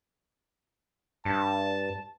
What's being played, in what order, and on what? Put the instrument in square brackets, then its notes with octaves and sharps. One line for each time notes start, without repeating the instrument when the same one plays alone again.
[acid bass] G2 [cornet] A5